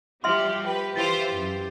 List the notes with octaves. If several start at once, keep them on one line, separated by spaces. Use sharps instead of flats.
F3 G3 G4 E5 C6 F6 F#7
G4 B4 G5
E3 F4 C5 A6 F7
F#2